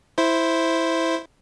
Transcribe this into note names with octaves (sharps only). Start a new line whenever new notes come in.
E4 C5